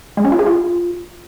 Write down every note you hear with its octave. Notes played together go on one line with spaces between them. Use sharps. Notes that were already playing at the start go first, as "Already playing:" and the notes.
G#3
C#4
F4
G#4
F4